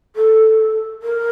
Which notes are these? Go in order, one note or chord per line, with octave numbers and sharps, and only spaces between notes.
A4
A#4